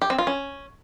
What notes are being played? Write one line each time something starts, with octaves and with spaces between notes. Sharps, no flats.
G4
C4
F4
C#4